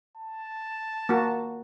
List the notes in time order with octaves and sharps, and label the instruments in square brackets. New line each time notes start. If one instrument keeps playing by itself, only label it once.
[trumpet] A5
[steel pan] A#3 F#4